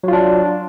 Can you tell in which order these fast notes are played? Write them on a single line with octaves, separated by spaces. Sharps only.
F#3 F4 D4